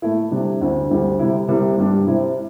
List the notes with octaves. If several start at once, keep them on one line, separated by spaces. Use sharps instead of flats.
A2 A3 E4
C3 G3 D4
D2 D3 C4 E4
D2 D3 G3 C4 E4
C3 G3 C4 E4
C2 C3 G3 E4
G2 G3 D4
C3 G3 C4 E4